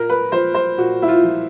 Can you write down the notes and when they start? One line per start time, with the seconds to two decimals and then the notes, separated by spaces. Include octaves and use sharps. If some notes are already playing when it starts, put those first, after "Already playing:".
Already playing: A#2 A#4
0.10 B4
0.32 F3 C5
0.54 C5
0.78 A#2 F#4
1.02 E4
1.08 F4
1.23 F3